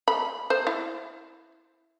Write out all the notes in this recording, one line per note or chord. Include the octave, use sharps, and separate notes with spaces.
B5
C5
E4